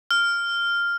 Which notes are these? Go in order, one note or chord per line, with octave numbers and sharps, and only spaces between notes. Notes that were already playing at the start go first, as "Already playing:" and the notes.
F6